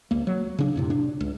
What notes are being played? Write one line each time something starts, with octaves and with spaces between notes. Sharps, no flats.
C#2 A#3
F#3
C#3 D4
F2 A2 C3
D4
C#2